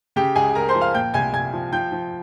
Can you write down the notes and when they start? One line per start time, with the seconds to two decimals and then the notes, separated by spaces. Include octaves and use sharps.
0.16 C#3 G4 G5
0.35 C#2 G#4 G#5
0.55 C#2 A#4 A#5
0.69 C5 C6
0.75 F3
0.81 F5 F6
0.94 A#2 G5 G6
1.14 C2 G#5 G#6
1.33 C2 G#5 G#6
1.53 F3
1.72 F3 G5 G6
1.92 F3